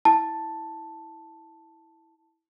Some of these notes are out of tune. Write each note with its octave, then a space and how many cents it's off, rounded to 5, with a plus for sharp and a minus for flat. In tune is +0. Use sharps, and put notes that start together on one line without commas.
E4 -10 A5 +0